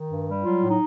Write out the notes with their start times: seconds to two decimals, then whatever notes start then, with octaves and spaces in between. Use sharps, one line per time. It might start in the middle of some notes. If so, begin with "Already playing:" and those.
Already playing: D#3
0.09 G2
0.27 G3
0.44 F#3 F4
0.62 A2
0.70 D#4